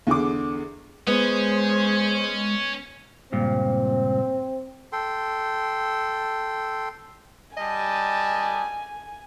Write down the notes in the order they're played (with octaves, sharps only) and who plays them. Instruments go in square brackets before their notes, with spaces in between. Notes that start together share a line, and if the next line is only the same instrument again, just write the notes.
[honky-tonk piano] E2 D3 G#4 D6
[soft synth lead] G#3 [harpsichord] B3 [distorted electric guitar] C#4 [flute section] G#4 C5
[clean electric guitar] C#2 G2 A#2 [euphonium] C4
[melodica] A4 G5 C6
[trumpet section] G3 A5 [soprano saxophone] D#5 [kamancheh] G#5